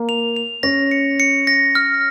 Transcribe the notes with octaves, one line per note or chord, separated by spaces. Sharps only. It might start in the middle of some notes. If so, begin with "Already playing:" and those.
Already playing: A#3
F7
F7
C#4 A#6
C#7
C#7
A#6
F6